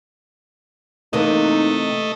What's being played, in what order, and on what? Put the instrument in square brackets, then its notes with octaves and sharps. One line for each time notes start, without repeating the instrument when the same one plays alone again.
[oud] C3 E3 A#3 [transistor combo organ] A3 D#5 [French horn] D#4